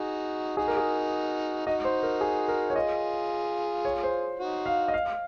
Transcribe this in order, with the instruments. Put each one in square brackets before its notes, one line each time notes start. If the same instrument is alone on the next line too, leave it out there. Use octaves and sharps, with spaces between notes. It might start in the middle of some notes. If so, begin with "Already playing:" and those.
Already playing: [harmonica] D#4 F#4 [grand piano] G#4
[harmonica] D#4 F#4 [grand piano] G#4
[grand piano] A#4
G#4
[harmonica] D#4 F#4 [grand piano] D#5
[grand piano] C5
A#4
G#4
A#4
C#5
[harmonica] F4 G#4 [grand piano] D#5
[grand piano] C#5
C5
[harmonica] D#4 F#4
[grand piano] F5
D#5
F5